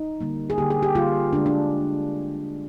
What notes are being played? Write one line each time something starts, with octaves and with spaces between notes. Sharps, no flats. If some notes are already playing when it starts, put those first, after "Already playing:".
Already playing: D#4
D3 G3 A#3
G#4
D3 G3 A#3 G4
G#4
G4
D3 G3 A#3 F4
D3 G#3 D4
D4